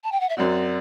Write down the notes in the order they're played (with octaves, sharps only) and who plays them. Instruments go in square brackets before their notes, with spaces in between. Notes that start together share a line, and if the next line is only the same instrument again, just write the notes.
[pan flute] A5
G5
F#5
E5
[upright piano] F#2 F#3 C4 F#4 [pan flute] D5